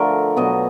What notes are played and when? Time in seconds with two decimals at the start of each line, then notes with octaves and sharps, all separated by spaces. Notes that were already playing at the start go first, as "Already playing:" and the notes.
Already playing: D3 F3 A3 A#4
0.36 B2 F#3 B3 D#5